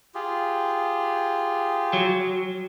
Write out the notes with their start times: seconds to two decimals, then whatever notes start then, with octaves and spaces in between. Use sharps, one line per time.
0.15 F4 G4 G#4
1.93 F#3